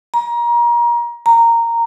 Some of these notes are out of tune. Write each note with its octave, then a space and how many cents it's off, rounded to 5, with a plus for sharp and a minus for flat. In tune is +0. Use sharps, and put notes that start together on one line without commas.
A#5 +30
A#5 -10